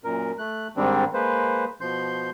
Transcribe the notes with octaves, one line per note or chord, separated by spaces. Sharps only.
F#2 A#2 A#4
A3 F#6
G#2 D#3 G3 C4 D4
G#3 A#3 B4 C5
B2 F3 C6 G6